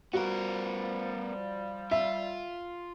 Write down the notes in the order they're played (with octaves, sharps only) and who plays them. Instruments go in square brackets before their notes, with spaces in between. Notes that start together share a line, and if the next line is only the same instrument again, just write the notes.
[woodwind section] F3 G3 [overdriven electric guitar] B3 A#4 [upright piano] F#4
[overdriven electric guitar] F4 [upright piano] E5